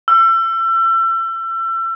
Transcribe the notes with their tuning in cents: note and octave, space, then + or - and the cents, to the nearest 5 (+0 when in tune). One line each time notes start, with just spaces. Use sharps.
E6 +35